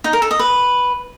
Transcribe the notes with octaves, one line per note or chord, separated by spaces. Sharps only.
D#4
A#4
A4
D#5
B4